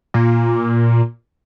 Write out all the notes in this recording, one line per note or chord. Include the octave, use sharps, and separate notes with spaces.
A#2